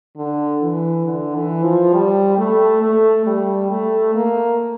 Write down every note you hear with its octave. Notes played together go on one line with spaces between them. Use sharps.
D3
E3
D3
E3
F3
G3
A3
A3
G3
A3
A#3